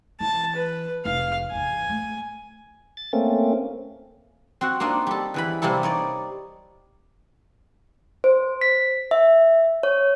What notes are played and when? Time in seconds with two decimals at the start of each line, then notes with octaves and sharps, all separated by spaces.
0.20 E3 A5
0.56 B4
1.05 F1 F5
1.51 G#1 E2 G#5
1.90 A3
2.97 A6
3.13 A3 A#3 C4 C#4
4.61 C4 F#4 F#5
4.80 A#3 C4 D4 D#4 F4
5.07 G3 A4
5.34 E2 E3 B5
5.62 C3 G3 A#3 E4 A4
5.83 D#4 C#5 D5
8.24 C5
8.61 B6
9.11 E5
9.83 C#5